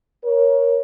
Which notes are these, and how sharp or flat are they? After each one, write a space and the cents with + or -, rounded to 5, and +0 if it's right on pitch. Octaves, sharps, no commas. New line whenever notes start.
A#4 +15 C#5 +0